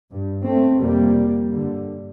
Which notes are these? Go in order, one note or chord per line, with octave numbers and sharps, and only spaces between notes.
G2
A3 C4
F2 C3 G3 A#3
G2 D3